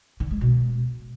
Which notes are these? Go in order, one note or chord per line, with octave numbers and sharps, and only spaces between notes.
D3
G#3
B2